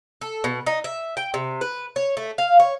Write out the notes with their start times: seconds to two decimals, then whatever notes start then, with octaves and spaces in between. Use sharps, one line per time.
0.21 A4
0.44 B2
0.67 D#4
0.84 E5
1.17 G5
1.34 C3
1.61 B4
1.96 C#5
2.17 A3
2.38 F5
2.60 C#5